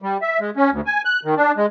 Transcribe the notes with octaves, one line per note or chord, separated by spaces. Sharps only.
G3
E5
G#3
C#4
D2
G#5
F#6
D#3
D4
G#3